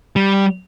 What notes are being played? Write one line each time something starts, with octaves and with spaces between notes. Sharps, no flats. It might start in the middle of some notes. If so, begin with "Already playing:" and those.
G3